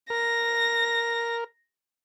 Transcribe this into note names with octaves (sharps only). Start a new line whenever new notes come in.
A#4 A#6